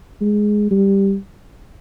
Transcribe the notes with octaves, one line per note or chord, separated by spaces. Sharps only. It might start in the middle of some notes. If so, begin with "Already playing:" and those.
G#3
G3